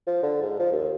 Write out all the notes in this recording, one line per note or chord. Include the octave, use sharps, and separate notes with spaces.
F3
D3
G#2
F3
D#2